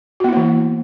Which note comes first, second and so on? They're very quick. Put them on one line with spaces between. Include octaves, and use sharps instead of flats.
F#4 B3 E4 A#3 E3